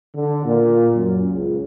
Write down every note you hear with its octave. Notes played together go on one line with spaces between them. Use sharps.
D3
A#2
F#2
C#2